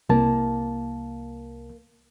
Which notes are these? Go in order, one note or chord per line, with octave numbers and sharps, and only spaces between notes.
C2 A#3 A5